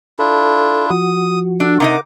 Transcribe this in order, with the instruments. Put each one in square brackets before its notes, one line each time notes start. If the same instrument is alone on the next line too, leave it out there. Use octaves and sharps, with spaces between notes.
[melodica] D4 E4 F4 [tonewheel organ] A4
[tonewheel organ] F3 F#4 [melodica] D#6
[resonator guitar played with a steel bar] D4 [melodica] A4
[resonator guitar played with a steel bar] C3 D#4 D#5 [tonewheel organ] A#4 F#5 [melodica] D6